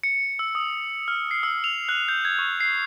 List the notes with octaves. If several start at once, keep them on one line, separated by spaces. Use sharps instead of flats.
C#7
E6
D#6
F6
C7
E6
F7
F#6
G6
G#6
C#6
C7